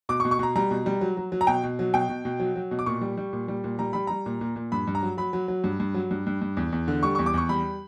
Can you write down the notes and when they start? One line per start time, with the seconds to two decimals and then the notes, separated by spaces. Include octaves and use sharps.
0.09 B2 D6
0.20 C#6
0.25 B2
0.31 C#6
0.39 B2 A#5
0.55 G3 A#5
0.71 B2
0.86 G3
1.01 F#3
1.17 F#3
1.32 F#3
1.41 A#5
1.47 B2 G5
1.63 B2
1.79 F#3
1.93 B2 G5
2.09 B2
2.25 B2
2.40 F#3
2.56 F#3
2.71 B2
2.79 D6
2.86 A#2 C#6
3.01 G3
3.17 G3
3.33 A#2
3.48 G3
3.64 A#2
3.79 G3 A#5
3.93 G3 B5
4.07 G3 A#5
4.26 A#2
4.41 A#2
4.56 A#2
4.72 G2 B5
4.87 G2
4.95 A#5
5.03 F#3
5.17 F#3 B5
5.33 F#3
5.48 F#3
5.64 G2
5.80 G2
5.94 F#3
6.11 G2
6.27 G2
6.41 G2
6.57 E2
6.72 E2
6.88 D3
7.03 G3 C#6
7.15 C#6
7.19 E2
7.26 D6
7.34 E2 C#6
7.49 G3 B5